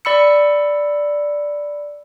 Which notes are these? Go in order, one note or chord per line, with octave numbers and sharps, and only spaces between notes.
D5 B5 E6 C#7